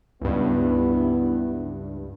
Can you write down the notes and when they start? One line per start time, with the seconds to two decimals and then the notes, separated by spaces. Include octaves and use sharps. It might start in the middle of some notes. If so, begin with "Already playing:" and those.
0.21 C#2 G2 B3 E4